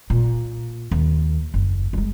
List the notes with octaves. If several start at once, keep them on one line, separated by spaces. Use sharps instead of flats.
A#2
D#2
F#1
G3 G#3